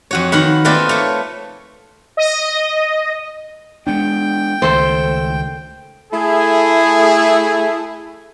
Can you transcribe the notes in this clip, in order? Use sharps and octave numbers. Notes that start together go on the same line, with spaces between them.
F2 F#4 C#5
D#3 B3 F#5 B5
A3 A#3 C4 F4 B4 D5
A3 C#5
D#5
G#3 B3 D4 G5
C#2 D#3 A3 A4 C5
A3 E4 G#4